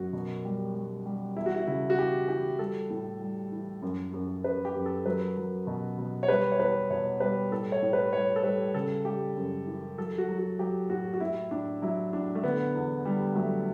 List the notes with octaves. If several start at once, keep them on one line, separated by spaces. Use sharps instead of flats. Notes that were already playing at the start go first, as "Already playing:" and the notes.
Already playing: F#2 F#3 F#4
B2
G3
G3
G3
E2 E4
F#4
E4
C#3 E4
F#4
E3 G4
E3 G4
G3 A4
A2
G3
E3
F#2
F#2
F#2 B4
G4
F#2
A4
F#3 B4
F#3
B2
B2
C#5
G3 B4
C#5
E2 B4
B2 C#5
G3 B4
A2 A4
C#5
A2
B4
G3 C#5
A4
G3 B4
C#3 A4
G3 G4
F#2
E3
F#3 A4
F#4
F#3
F#4
F#3 G4
A2 F#4
F#4
A2 E4
A2 D4
F#3 E4
A2 D4
A3
D3 B3
E2
D3 G3
F#3 A3